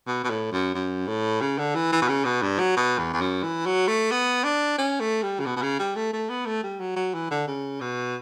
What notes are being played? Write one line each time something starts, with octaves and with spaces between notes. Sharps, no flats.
B2
B2
A2
F#2
F#2
A2
C#3
D3
E3
E3
B2
C#3
B2
G2
F#3
B2
E2
E2
F#2
E3
F#3
A3
B3
D4
C#4
A3
G3
C#3
B2
B2
C#3
G3
A3
A3
B3
A3
G3
F#3
F#3
E3
D3
C#3
B2